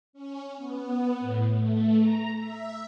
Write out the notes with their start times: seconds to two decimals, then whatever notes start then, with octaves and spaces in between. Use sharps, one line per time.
0.13 C#4
0.57 B3
1.20 A2
1.54 A3
1.99 A#5
2.38 E5